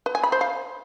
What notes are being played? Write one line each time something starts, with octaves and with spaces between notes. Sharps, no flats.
B4
G#5
B5
C5
F5